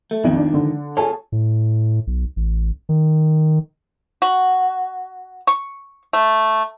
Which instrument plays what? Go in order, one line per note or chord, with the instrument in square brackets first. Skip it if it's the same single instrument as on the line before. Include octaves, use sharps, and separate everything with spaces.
[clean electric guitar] A3
[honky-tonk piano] B1 F2 [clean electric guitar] G#2 D#3 F3
[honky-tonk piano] D4
D3
[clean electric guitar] F4 A4 C#5 [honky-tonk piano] G#4 G#5 A5
[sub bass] A2
B1
A1
D#3
[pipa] F#4
C#6
A3